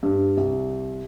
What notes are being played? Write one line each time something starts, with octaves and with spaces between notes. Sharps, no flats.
G2
C2